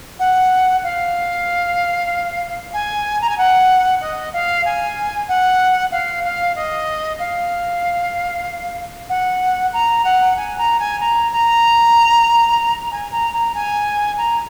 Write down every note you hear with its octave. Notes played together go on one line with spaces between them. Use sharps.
F#5
F5
G#5
A#5
G#5
F#5
D#5
F5
G#5
F#5
F5
F5
D#5
F5
F#5
A#5
F#5
G#5
A#5
G#5
A#5
A#5
G#5
A#5
A#5
G#5
A#5